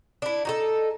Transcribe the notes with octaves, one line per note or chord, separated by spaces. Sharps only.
D4 E4
D#4 F#4 A4